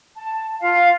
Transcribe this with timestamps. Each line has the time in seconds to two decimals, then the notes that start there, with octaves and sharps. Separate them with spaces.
0.15 A5
0.61 F4 F5